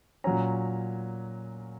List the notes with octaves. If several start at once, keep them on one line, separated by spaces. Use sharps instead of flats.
A#2 F#3 C#4 A#5